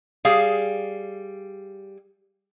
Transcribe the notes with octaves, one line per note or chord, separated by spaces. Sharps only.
G3 G#4 F5